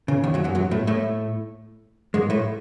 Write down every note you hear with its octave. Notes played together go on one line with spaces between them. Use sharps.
C#3
D#2 D#3
F#2 F#3
F#2 F#3
F#2 F#3
A2 A3
A2 A3
G#2 G#3
A2 A3